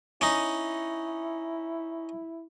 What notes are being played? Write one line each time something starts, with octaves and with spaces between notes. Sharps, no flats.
C#4 D#4 E4